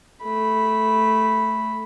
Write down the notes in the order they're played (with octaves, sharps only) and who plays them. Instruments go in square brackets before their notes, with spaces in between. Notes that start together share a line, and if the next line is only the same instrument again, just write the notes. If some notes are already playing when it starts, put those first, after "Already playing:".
[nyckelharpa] A3 B5